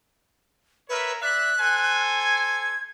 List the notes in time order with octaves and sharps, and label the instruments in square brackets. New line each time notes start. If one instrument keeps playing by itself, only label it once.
[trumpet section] A#4 C#5 E5 [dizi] B4
[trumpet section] D5 E5 [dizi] F#6
[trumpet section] A4 C5 G#5
[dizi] G#6